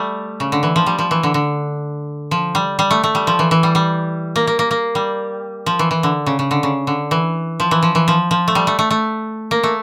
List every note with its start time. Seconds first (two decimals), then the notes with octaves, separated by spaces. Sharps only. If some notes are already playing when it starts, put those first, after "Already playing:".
Already playing: G3 A3
0.40 C#3
0.52 D3
0.63 E3
0.76 F3
0.86 G3
0.99 F3
1.11 E3
1.23 D3
1.34 D3
2.31 F3
2.55 G3
2.79 G3
2.91 A3
3.04 A3
3.15 G3
3.27 F3
3.39 E3
3.51 E3
3.63 G3
3.75 G3
4.36 A#3
4.47 A#3
4.59 A#3
4.71 A#3
4.95 G3
5.66 F3
5.79 E3
5.91 E3
6.03 D3
6.26 C#3
6.39 C#3
6.51 D3
6.63 C#3
6.87 D3
7.11 E3
7.60 F3
7.71 E3
7.82 F3
7.95 E3
8.08 F3
8.31 F3
8.48 A3
8.55 G3
8.67 A3
8.79 A3
8.91 A3
9.51 A#3
9.63 A3